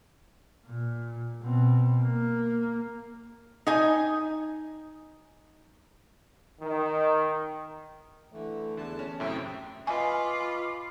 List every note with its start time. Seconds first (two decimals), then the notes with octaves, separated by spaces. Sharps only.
0.66 A#2
1.42 B2 C4
2.02 A#3
3.67 D#4 G#5
6.61 D#3
8.33 D3 E3 A3
8.77 E2 D3 A5
8.99 C#4
9.20 F#2 A2 C3 E5 G5
9.87 F4 B4 D#5 F5 G#5 B5 C#6 D6